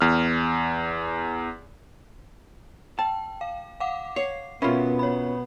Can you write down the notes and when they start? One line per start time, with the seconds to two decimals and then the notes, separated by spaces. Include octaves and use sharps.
0.01 E2 F6
2.99 G5 A5
3.41 F5
3.80 F5 F#5 D6
4.16 C#5 C7
4.62 B2 B3 C#4 F4 A#4 E5 B5
4.99 C#5 B5